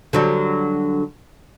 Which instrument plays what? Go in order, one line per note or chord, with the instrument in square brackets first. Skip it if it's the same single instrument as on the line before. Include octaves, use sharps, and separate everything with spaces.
[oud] D3 F#3 G3